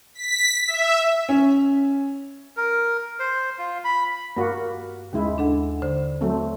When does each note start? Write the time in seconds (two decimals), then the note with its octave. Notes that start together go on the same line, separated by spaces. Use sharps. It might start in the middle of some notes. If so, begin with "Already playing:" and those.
0.14 B6
0.68 E5
1.29 C#4
2.57 A#4
3.20 C5
3.59 F4
3.85 B5
4.37 G2 A#3 F#4
5.13 D#2 C#3 G#3 E4
5.38 D4 A4 F#5
5.82 D3 C5
6.21 F#3 A3 C4